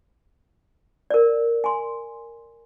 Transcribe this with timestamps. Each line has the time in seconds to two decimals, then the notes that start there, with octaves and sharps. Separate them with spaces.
1.10 A#4 D5
1.64 G#5 C6